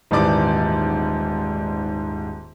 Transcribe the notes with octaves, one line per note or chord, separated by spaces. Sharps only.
D#1 G#2 E3 D5 D6